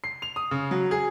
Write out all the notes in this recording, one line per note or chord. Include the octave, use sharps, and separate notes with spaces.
C7
F7
D#6
C#3
F#3
G#4